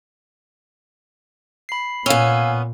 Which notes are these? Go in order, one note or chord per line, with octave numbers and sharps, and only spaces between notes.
B5 C7
A#2 B3 C#4 F5 G#5 E6